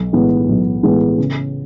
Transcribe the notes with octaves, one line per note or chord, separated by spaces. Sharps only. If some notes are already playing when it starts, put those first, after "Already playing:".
Already playing: B1
A2 E3 G#3 B3
B1
A2 E3 G#3 B3
C#3